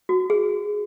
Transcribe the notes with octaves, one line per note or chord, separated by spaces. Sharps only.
F#4
G#4